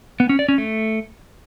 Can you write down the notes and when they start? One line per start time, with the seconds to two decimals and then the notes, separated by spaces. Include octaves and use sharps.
0.20 B3
0.29 C#4
0.39 D5
0.49 C#4
0.58 A3